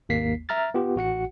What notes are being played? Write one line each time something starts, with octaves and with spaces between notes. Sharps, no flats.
G#1 D#2 A#3 B6 C7
E5 A#5 F6 A6
B3 F4 G4
A1 F#4 F#5 C#7